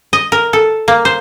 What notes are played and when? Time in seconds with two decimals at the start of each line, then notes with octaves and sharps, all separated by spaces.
0.13 D#5
0.32 A#4
0.53 A4
0.88 A#3
1.05 C5